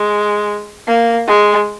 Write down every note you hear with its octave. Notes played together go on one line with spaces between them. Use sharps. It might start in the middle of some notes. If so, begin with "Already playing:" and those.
Already playing: G#3
A#3
G#3